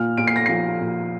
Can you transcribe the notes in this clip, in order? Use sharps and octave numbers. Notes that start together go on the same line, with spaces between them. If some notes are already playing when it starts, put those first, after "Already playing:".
Already playing: A#2 F6
A#2 D7
C7
A#6
F3 C7
A#2